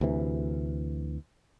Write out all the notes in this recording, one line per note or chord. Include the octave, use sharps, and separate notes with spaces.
D2 C3 E3